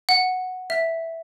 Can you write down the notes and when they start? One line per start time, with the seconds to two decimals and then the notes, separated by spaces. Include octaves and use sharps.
0.09 F#5
0.70 E5